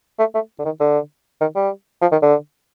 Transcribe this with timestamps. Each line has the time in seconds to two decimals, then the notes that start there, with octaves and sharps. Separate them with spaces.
0.19 A3
0.34 A3
0.59 D3
0.65 D#3
0.80 D3
1.41 D#3
1.55 G3
2.01 F3
2.12 D#3
2.22 D3